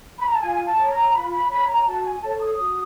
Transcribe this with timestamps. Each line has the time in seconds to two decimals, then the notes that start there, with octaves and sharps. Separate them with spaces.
0.19 B5
0.27 A#5
0.34 A5
0.41 F4 G#5
0.65 A5
0.77 A#4 C#5
0.90 A#5
1.14 F4 B5
1.32 B5
1.50 A#4 C#5 B5
1.67 A#5
1.86 F#4 A5
2.04 G#5
2.22 A4 C#5 A5
2.41 D#6
2.59 F#4